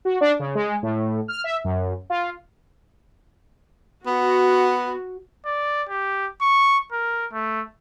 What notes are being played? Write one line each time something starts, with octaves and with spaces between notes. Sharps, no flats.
F#4
D4
C#3
G#3
A2
F6
E5
F#2
F4
B3 F#4
D5
G4
C#6
A#4
A3